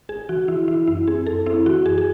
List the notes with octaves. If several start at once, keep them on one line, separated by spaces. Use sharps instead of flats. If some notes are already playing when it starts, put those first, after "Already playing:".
G#1 G#4
E3 F#4
E3 E4
E3 E4
F#2 E4
C4 G#4
F#2 A4
C4 E4
E3 F#4
F#2 G#4
G#4